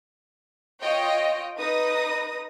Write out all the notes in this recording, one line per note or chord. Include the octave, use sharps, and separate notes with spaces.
F4 C#5 D#5 G5
D#4 B4 D#6 A#6